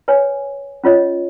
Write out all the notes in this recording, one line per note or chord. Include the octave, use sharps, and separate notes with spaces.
B4 C#5 G#5
C#4 F4 C#5 D#5